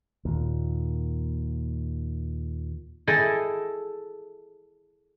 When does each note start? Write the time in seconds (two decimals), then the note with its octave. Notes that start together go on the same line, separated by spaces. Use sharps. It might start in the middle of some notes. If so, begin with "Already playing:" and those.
0.25 D#2 A#2
3.07 E4 G#4 A4 D#5 G5 A5